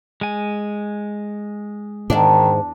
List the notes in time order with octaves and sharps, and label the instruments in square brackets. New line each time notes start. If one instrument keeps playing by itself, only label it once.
[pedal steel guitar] G#3 G#5
[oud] E2 D4 [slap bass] G#2 [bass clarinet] D#3